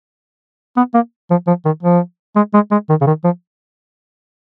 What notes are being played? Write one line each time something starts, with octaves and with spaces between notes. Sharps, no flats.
B3
A#3
F3
F3
D#3
F3
G#3
G#3
G#3
D#3
C#3
D#3
F3